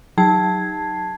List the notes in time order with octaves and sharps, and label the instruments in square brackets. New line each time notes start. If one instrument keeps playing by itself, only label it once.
[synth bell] F#3 D#4 A5 G#6 C7